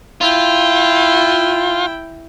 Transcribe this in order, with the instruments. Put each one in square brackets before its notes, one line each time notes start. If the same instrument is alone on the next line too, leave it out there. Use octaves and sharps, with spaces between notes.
[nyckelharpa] E4 G5 [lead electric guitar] F4